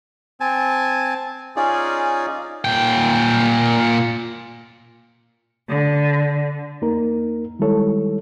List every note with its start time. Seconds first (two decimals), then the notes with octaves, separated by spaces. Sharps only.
0.41 C4 G#5 A5
1.56 C#4 D#4 F4 G#4 D5
2.65 A#2 G5
5.70 D3
6.82 E2 A#3 D#4 A#4
7.59 D#3 G3 G#3 E4 A4 C#5